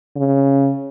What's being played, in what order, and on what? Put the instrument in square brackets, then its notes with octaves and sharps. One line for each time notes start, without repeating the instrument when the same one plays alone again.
[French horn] C#3